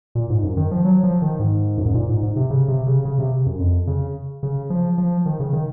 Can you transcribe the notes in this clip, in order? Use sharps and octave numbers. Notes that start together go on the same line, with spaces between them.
A#2
G#2
F#2
D#3
F3
F#3
F3
D#3
G#2
F#2
G#2
A#2
G#2
G#2
C3
C#3
C3
C#3
C#3
C3
F#2
F2
C#3
C#3
F3
F3
D#3
C#3
D#3